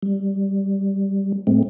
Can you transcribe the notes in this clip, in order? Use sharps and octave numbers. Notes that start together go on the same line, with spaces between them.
G3
A2 G#3 A3 C4